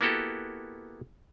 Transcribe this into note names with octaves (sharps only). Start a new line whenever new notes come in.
A#3 B3 E4 F#4 G4 A4